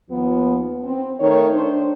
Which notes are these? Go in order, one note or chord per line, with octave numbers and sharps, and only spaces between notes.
D#2 F3 B3
C4
D#3 A3 A#4 C#5
D4 C5